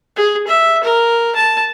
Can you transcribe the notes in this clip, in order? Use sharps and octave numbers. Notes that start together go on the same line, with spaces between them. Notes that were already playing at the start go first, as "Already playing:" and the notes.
G#4
E5
A#4
A5